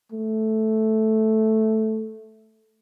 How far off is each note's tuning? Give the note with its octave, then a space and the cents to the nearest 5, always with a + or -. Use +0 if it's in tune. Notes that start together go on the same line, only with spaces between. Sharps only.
A3 -5